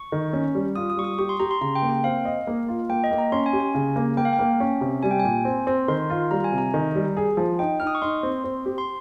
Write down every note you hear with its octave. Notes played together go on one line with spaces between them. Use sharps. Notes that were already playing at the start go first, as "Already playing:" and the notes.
Already playing: C#6
D#3
C#4
G3
F4 D#6
D#6
G3 C#6
D#6
G4 C#6
C6
G4 A#5
C6
C#3 A#5
G5
A#3
G5
C4 F5
D#5
A#3
F4
A#3 G5
D#5
A#3
A#5
C#4 C6
G#5
G4
G#5
C#3
A#3
A#3 G5
F5
G5
A#3
C#4
C3
G3 G#5
G5
A#2 G#5
C4
C4
D#3 C6
F4
G3 A#5
G#5
C3
A#5
D#3
G3
G#4
F3
D#4 G5
D#4 F6
D#6
C#6
D#4 C6
C4
C4
G4
C6